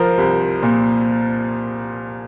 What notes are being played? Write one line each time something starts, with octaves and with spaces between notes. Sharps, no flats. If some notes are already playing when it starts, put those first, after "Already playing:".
Already playing: F3 A#4 C5
C2
A#2